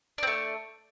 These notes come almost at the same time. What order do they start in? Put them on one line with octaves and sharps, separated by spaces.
D4 C4 A3